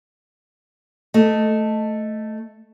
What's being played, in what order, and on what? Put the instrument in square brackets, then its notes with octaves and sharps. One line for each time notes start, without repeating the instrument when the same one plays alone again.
[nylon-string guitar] A3 D#5